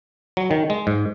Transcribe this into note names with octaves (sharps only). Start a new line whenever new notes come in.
F#3
D#3
G#3
G#2